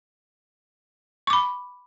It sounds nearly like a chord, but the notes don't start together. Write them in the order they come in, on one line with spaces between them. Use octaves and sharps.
C#6 D6 B5